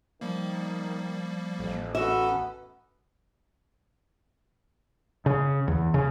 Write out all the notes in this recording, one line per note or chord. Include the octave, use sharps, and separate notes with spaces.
D#3 F3 G3 A#3
A1 F2
B3 C#4 F#4 A4 E5
C#3
E2
C#3